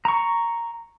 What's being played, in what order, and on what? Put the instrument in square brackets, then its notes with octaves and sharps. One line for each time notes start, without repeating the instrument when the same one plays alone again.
[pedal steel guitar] A#5 C#6